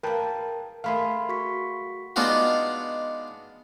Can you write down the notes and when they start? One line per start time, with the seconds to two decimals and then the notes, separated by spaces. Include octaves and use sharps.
0.03 A#3 A#4 B4 G5 A5
0.84 A3 A#3 G#4 F5 B5 C6
1.29 F#4 C#6 B6
2.16 G#3 B3 D4 D#4 F4 F#4